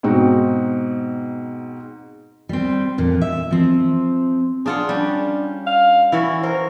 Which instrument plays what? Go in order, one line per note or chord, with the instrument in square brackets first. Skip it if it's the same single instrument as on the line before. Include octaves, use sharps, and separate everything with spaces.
[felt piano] G#2 B2 C4 D#4 F#4
[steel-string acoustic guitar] G3 C4
F2 A#2
E5
F3 C4
[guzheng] D4 F4 F#5 [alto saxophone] G#4
[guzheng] G3 C#4 [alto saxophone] D4
[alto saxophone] F5
[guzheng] E3 F#4 C#5 [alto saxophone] E4
[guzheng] A#4 [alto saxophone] C5